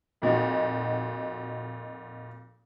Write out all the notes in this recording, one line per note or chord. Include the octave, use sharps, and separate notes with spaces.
F2 A#2 D#4 F#4